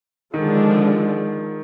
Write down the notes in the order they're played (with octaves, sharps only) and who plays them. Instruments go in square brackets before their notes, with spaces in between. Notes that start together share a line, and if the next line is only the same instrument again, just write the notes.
[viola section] D3 F3 G#3 D4 G#4 [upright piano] D#3